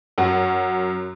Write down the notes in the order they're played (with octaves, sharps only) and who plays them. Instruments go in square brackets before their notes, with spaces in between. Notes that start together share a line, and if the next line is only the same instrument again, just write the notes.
[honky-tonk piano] F#2 F#4